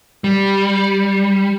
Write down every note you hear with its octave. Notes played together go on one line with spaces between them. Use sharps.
G3